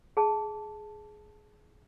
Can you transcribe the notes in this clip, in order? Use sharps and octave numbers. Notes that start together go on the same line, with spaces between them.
G#4 A5